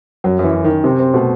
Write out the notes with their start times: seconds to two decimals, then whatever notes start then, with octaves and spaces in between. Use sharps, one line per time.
0.24 F#2 F#3
0.39 F#2 E3
0.54 F#2
0.64 F#2 D#3
0.84 C3 C4
0.99 C4
1.14 B2 A3